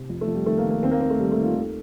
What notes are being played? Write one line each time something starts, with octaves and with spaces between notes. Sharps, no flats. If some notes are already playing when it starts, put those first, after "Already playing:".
Already playing: C3
F2
A3
F2
G3
D#3 A3
A#3
D#3
A#3
D#2 C4
A#3
D#2 C4
A3
D#3 G3
A3
D#3
F4
D#2 A4